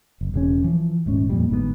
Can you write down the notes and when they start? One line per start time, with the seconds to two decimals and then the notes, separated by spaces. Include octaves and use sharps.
0.21 F#1
0.34 E1 C#3 C#4
0.64 E3 F3
1.06 D#1 G#2 C#4
1.29 F2 A#2 G3
1.50 G1 G#2 C3 B3